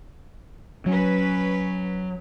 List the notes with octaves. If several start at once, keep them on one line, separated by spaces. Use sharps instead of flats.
F#3 C#4 B4